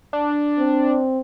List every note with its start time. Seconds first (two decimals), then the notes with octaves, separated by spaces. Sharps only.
0.13 D4
0.59 C4